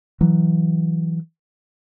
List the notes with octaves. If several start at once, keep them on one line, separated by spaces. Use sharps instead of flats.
E3 F#3